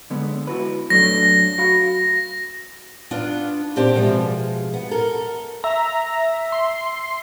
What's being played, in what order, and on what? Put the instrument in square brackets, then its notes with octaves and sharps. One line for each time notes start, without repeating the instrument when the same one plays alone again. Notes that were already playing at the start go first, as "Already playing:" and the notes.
[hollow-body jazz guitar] D3 G#3 B3
E4 F#4 B4
[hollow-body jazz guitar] F#3 A3 D4 [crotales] A#6
[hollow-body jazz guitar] F#4 F5 B5
[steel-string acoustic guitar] B3 D4 F4
A#2 C4 G4 D5 A5
B2 F3 G#3 E5
B3
A4 A#4
[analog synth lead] E5 [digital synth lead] A#5
[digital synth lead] C6